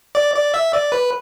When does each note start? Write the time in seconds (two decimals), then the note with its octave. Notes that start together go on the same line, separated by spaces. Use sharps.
0.15 D5
0.35 D5
0.54 E5
0.73 D5
0.92 B4